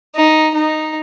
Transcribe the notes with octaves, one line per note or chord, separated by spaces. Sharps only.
D#4
D#4